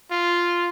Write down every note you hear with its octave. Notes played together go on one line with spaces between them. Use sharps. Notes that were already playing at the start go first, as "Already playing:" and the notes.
F4